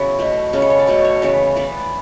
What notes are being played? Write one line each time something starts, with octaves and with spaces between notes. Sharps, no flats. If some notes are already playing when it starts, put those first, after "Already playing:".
Already playing: C#3 F#3 B3 E4
B2 A3
C#3 G#3 B3 C#4
A4
C#5
D5
B2 F#3 A3
C#5
C#3 E3 B3
E3 B3 D5